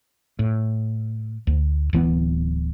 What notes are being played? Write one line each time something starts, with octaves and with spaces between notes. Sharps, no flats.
A2
D2
D1 E3 B3